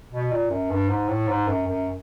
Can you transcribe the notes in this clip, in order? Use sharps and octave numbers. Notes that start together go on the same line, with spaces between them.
B2
A#2
F#2
G2
G#2
A2
G#2
F#2
F#2